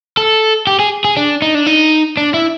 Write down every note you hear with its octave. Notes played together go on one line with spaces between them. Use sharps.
A4
G4
G#4
G#4
D4
D#4
D4
D#4
D4
E4